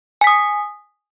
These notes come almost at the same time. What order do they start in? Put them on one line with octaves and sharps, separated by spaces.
G#5 B6 D#6